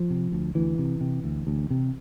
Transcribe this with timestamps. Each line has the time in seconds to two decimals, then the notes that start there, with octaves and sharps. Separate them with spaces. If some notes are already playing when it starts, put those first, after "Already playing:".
Already playing: F3
0.10 C3
0.32 D2
0.55 D2 E3
0.79 C3
1.01 C3
1.24 D2
1.47 D2
1.70 C3